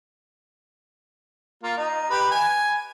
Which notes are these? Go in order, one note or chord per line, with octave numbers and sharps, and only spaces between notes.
A#3 F4
D#4
G4 B4
G#5